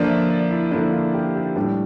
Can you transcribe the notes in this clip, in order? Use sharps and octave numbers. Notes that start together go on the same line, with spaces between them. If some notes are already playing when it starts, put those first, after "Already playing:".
Already playing: D3 F3 A#3 D4 D5
E5
D5
E4
D3 F3 A#3 D4 E4
F4
G4
G4
A2 G3 D4 G4